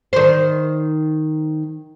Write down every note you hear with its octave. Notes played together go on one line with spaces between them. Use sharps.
D#3 C5